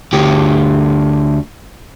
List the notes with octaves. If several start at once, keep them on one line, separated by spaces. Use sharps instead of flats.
D2 G4